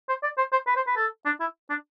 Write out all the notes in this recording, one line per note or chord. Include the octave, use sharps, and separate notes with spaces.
C5
D5
C5
C5
B4
C5
B4
A4
D4
E4
D4